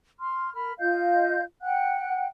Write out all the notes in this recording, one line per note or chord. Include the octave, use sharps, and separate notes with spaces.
C6 F6
A#4 B5 F6
F4 D#5 F5 G6
F#5 G5 F#6